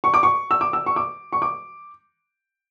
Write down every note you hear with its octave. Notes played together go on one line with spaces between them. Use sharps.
C#6
D6
C#6
E6
D6
E6
C#6
D6
C#6
D6